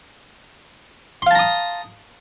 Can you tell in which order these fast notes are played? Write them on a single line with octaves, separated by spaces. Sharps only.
C6 F5 A5 A#5 D#6